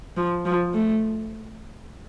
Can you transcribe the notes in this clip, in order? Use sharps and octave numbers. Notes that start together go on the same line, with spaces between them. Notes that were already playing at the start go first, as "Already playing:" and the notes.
F3
F3
A3